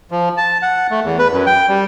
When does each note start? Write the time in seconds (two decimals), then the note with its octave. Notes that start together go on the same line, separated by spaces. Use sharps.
0.11 F3
0.37 A5
0.62 F#5
0.91 A3
1.04 E2
1.19 B4
1.32 F#2
1.46 G5
1.69 G3